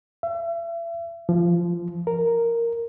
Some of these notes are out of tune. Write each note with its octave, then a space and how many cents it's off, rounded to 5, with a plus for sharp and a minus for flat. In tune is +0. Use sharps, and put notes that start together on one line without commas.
E5 +40
F3 -15
A#4 -5